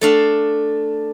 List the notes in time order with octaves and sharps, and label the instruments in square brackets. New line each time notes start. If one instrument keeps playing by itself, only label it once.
[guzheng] A3 D4 F5